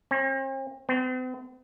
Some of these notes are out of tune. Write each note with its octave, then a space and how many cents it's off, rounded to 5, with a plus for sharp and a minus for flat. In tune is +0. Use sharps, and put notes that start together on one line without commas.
C4 +45
C4 -45